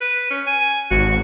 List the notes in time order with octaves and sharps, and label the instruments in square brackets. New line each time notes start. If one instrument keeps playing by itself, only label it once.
[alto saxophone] B4
C#4
G#5
[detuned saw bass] G#1 [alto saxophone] F#4